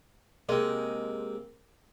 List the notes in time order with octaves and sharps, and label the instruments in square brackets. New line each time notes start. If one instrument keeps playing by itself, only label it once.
[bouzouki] C3 G#3 D#5 [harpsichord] A#3 C4